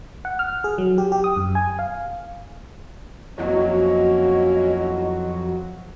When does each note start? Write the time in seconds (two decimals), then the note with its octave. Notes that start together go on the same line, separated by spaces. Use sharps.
0.25 F#5
0.39 F6
0.64 G#4
0.78 F#3
0.98 G4
1.12 G4
1.24 D#6
1.37 F#2
1.55 G#5
1.79 F5
3.38 F2 F#3 A#3 C#4 E4 F#4 D#5